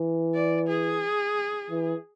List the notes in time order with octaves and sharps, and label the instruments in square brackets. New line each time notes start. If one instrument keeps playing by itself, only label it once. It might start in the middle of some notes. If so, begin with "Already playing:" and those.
Already playing: [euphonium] E3
[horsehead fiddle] D5
G#4
[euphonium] E3